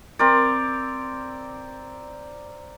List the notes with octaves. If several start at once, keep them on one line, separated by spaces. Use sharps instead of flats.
C4 A#4 D5